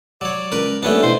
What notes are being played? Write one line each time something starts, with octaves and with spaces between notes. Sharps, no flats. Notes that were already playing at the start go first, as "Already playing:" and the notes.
F#3 C#5 D5
C#2 A#4 B4
D#1 A3 B3 C#4 D4
B2 E3 C5